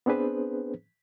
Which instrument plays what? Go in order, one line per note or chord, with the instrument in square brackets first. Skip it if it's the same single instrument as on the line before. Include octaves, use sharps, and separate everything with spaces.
[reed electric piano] B3 C4 D4 G#4 B4 C5